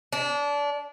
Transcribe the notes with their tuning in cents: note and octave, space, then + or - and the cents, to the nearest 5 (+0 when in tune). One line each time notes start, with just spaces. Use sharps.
D4 -25